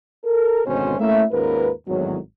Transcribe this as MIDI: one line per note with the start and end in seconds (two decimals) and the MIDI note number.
0.25 0.66 69
0.25 0.66 70
0.66 0.95 32
0.66 0.95 47
0.66 0.95 50
0.66 0.95 61
0.66 0.95 72
0.99 1.23 57
0.99 1.23 58
0.99 1.23 61
0.99 1.23 64
0.99 1.23 76
1.31 1.71 39
1.31 1.71 44
1.31 1.71 61
1.31 1.71 65
1.31 1.71 70
1.31 1.71 71
1.88 2.18 32
1.88 2.18 40
1.88 2.18 45
1.88 2.18 51
1.88 2.18 54